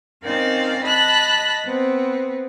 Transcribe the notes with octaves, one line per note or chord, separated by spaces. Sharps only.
C4 C#4 D#4 A#4 D5 F5
D#5 A5 B5 F#6 A#6
B3 C4